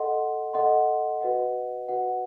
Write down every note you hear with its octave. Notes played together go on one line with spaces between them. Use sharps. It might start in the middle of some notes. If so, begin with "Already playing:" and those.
Already playing: A4 D#5 F#5 C6
A4 D#5 F#5 C6
F#4 B4 D#5 F#5
F#4 B4 D#5 F#5